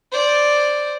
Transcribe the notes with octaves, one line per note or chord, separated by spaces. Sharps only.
C5 D5